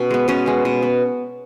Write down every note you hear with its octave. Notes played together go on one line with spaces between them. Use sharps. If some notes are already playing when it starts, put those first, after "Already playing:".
Already playing: B2 C#4
G#3 B3
B2 C#4
G#3 B3
B2
B3